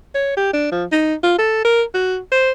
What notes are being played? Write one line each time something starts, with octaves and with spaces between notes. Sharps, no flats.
C#5
G4
D4
F3
D#4
F4
A4
A#4
F#4
C5